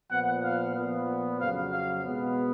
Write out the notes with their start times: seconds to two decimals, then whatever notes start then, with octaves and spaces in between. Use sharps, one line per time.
0.11 A#2 F3 B3 F#5
0.44 F5
0.76 A#2 F3 B3
1.40 F2 C#3 F#3 F5
1.73 F5
2.06 B2 G#3 B3